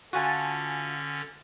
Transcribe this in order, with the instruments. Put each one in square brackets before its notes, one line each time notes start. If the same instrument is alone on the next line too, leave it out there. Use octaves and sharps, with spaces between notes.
[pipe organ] D3 C#4 [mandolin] F4 G#5 A5 [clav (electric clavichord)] F#4